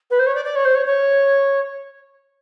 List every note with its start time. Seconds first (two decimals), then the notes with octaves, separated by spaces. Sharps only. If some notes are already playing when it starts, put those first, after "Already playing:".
0.10 B4
0.19 C5
0.26 C#5
0.35 D5
0.45 D5
0.55 C#5
0.65 C5
0.75 C#5
0.86 C#5